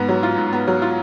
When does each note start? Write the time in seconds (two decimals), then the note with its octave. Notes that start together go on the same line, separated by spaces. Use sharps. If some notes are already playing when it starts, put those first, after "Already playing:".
Already playing: G#2 B3
0.09 F#3
0.23 F4
0.38 G#2
0.53 B3
0.68 F#3
0.82 F4